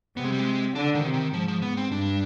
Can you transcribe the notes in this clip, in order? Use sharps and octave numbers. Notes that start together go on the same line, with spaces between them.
C3 B3
G#3
G3
G#3
D3 D4
D#3
C3
D#3
G#2 F3
F3
B3
C4
G2 D4